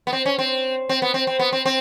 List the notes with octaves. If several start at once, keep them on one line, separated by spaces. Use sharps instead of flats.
B3
C4
C#4
C4
C4
B3
C4
C4
B3
C4
C4